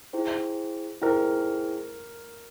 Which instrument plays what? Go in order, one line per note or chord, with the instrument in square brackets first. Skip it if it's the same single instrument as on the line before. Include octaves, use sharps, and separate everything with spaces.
[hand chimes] E4 G#4 C5 G5
[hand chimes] E4 G#4 C5 G5 [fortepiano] A#4